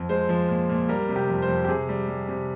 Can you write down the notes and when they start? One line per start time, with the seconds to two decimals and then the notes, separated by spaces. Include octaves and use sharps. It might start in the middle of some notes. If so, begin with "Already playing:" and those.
Already playing: F2
0.09 G#3 C5
0.29 F3
0.49 A#2
0.69 A#2
0.89 G3 A#4
1.09 C3
1.16 G4
1.29 F2
1.42 C5
1.49 F2
1.64 G4
1.68 C3 G#4
1.89 G3
2.08 G3
2.28 C3